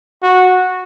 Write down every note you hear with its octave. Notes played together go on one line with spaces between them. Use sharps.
F#4